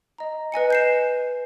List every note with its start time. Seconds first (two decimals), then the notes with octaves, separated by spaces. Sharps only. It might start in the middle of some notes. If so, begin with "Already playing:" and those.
0.18 D#5 A#5
0.52 B4 D#5 G#5 C#7
0.70 G6 C7 E7